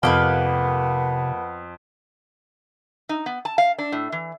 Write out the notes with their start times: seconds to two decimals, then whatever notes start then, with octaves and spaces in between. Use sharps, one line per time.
0.03 F2 C3 A#3 B3 G4 B4
3.09 D#4
3.26 B3
3.45 A5
3.58 F5
3.78 D4
3.92 A2
4.12 E3